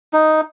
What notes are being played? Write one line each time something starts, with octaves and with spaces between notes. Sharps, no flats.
D#4